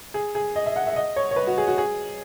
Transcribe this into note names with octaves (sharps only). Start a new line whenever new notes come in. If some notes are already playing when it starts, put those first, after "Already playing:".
G#4
G#4
D#5
E5
F#5
E5
D#5
C#5
C#5
B4
F#4
G#4
F#4
G#4